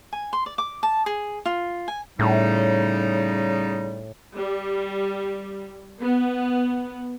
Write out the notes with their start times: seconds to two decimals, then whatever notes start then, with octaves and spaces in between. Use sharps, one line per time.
0.13 G#5
0.33 C6
0.46 D5
0.58 D6
0.83 A5
1.06 G#4
1.45 F4
1.88 G#5
2.19 A2 C#3 G3 D#4
4.36 G3
6.01 B3